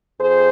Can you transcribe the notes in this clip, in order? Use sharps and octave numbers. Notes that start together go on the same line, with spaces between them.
F2 G#4 C5